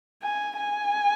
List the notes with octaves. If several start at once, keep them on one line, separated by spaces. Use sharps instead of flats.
G#5
G#5